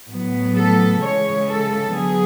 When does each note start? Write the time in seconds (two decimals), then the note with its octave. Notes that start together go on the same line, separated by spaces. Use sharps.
0.09 A2 F#3 B3
0.55 A4
1.01 C#3 E3 G#3 C#5
1.47 A4
1.93 D3 F#3 B3 G#4